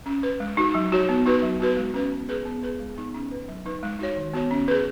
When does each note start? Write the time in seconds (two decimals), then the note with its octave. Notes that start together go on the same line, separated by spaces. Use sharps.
0.06 C#4
0.23 B4
0.40 G#3
0.57 D#4 F#4
0.75 F#3
0.92 D#4 F#4 C#5
1.09 B3
1.26 D#4 F#4 B4
1.42 F#3
1.60 B3 F#4 B4
1.77 G#3
1.94 C#4 B4
2.12 B3
2.29 G#4 B4
2.45 B3
2.63 G#4 B4
2.80 G#3
2.97 B3 D#4
3.14 C#4
3.31 B4
3.48 F#3
3.66 D#4 B4
3.83 G#3
3.99 D#4 F#4 C#5
4.17 D#3
4.34 B3 F#4 C#5
4.51 C#4
4.68 G#4 B4